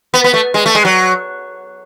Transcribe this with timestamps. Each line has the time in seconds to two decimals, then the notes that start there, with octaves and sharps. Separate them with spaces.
0.14 B3
0.24 B3
0.34 A3
0.54 G#3
0.66 A3
0.75 G#3
0.85 F#3